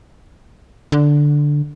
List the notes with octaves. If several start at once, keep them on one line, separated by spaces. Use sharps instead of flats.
D3